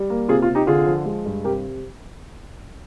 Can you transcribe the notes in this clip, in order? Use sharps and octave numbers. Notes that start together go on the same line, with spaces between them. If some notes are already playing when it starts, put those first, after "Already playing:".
Already playing: G3
A#3
C3 F4 G#4
F4
C3
D#4 G4
D3 F4 G#4
F3
G#3
G2
C3 G4 A#4